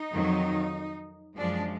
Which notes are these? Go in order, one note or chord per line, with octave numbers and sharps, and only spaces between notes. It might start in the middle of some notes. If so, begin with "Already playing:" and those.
Already playing: D#4
F2 D#3 F#3
F#2 F3 G#3 D4